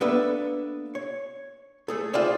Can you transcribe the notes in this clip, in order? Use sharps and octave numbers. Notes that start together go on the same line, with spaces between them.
A#3 B3 D4 A4 B4 E5
C#5
A3 G#4 A4
F4 G4 G#4 C5 D5 E5